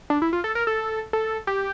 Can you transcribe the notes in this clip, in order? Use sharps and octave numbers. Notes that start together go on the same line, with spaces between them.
D4
E4
F4
A4
A#4
A4
A4
G4